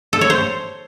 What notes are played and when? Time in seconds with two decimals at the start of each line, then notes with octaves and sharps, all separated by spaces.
0.13 A4
0.21 C#5
0.30 C5